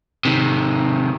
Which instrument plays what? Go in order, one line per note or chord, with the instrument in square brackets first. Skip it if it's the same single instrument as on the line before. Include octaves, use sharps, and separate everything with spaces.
[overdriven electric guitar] C3 D#3